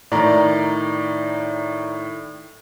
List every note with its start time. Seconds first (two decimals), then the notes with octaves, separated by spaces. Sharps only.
0.12 A2 D#3 D5 A#5